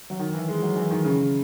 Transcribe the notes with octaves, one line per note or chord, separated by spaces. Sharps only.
F#3
D#3
E3
G#3
F#3
E3
D#3
C#3